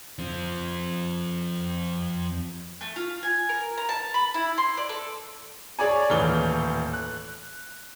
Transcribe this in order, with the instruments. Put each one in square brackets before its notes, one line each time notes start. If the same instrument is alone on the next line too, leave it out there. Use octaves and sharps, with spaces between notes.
[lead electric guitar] F3 C4
[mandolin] A3
F4
G#5
A#4
A#5
A5
B5
E4
C6
D5
A4
[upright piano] G#4 C#5 D5 G#5
D#1 A2 E3 F6 G7
F#6